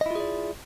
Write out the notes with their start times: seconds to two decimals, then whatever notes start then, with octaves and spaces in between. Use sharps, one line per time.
0.01 D#5
0.06 E4
0.11 F4
0.15 G#4
0.20 D5